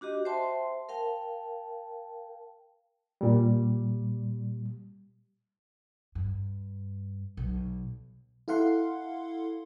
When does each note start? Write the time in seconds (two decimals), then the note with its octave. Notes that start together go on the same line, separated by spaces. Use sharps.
0.01 D4 F#4 G4 D#5
0.25 C5 E5 G5 A5 C6
0.89 A#4 F5 G5 A5
3.21 A#2 G3
6.15 G2
7.37 B1
8.48 E4 A4 F5 F#5 C6